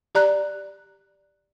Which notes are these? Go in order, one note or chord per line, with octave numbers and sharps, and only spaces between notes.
G4 D5 A#5 F#6